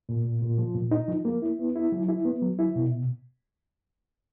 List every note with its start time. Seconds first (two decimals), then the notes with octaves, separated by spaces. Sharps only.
0.09 A#2
0.25 A#2
0.42 A#2
0.58 F3
0.75 A#2
0.91 D#4
1.08 F3
1.25 A#3
1.42 E4
1.59 B3
1.76 E4
1.92 F#3
2.08 E4
2.25 B3
2.42 F#3
2.59 E4
2.75 B2